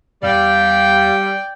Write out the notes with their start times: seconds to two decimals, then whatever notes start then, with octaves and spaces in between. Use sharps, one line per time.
0.23 E2 G3 D5 F5 G5